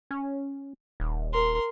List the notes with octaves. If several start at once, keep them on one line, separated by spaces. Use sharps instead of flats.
C#4
D#1
A#4 C6